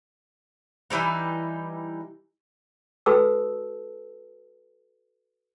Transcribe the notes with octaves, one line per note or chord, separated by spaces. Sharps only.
E3 G3 D#4
F#4 A4 B4 A5 E6